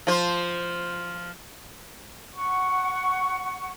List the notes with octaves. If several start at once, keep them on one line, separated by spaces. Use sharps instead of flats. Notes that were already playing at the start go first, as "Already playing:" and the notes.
F3 C5
F#5 C#6